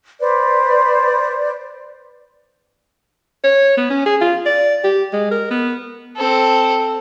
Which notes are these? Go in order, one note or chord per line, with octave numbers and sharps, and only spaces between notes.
B4 C5 D5
C#5
B3
C#4
G#4
F4
D5
G4
G#3
A#4
B3
C4 A4